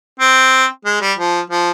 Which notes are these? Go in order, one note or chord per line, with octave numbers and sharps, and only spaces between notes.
C4
G#3
G3
F3
F3